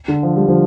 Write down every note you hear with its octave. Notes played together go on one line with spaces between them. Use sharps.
D3
F3
G3
D3 F3